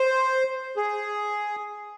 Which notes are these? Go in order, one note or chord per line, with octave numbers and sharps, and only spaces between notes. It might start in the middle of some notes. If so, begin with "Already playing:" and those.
Already playing: C5
G#4